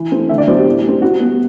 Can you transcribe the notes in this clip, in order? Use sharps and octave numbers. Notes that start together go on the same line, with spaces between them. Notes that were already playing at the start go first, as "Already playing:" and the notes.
Already playing: E3
A3 C4
D3 E5
D5
F#3 B3 C5
G4
A2
G3
C4
C3 F#4
G3 B3